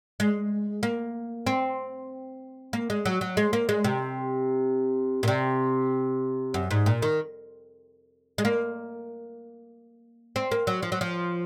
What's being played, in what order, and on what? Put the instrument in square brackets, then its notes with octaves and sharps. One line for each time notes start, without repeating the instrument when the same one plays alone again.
[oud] G#3
A#3
C4
A#3
G#3
F#3
F#3
G#3
A#3
G#3
C3
A#2
C3
F#2
G#2
A#2
D#3
G#3
A#3
C4
A#3
F#3
F3
F#3
F3